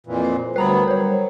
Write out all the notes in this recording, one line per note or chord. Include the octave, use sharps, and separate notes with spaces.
F2 A#2 E3
C5
D2 F#3 G3 B3 A#4 B4 A#5 B5
F#3 C5 C#5